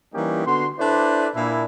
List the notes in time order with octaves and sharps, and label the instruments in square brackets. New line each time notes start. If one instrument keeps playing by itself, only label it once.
[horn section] E3 G3 A#3 C#4 D#4 G4
D3 B3 F#4 C6
D4 E4 A4 B4 C5 D5
A#2 D4 E4